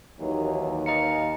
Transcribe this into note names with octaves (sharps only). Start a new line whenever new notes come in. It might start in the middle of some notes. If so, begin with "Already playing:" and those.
D#2 E3 F#3
D#5 F5 A#5 C#7